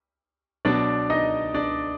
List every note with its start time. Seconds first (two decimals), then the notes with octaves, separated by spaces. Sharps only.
0.65 B2 F#3 D4 D5
1.10 D#4 D#5
1.54 D4 D5